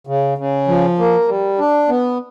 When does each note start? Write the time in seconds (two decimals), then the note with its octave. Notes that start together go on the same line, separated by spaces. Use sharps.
0.07 C#3
0.38 C#3
0.68 F3
0.99 A#3
1.28 G3
1.59 D4
1.89 B3